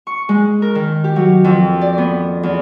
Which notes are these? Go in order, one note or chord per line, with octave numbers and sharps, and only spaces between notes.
C#6
G#3
A#4
D#3
G4
F#3
F2
D5
B3
E2